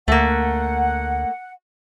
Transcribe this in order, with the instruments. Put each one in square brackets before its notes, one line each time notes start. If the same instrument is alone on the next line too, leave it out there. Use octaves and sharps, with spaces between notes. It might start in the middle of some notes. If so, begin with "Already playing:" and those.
[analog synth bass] D2 [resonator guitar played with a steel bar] A3 A#3 [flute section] F#5